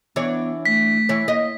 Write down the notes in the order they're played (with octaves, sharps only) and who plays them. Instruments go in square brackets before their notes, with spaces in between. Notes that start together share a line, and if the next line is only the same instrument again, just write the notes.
[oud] E3 D4 C#5 [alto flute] B3
[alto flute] A3 [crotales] B6
[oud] E3 C#5
[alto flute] A#3 [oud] D#5